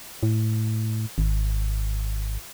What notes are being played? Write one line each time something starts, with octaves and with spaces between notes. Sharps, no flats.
A2
G#1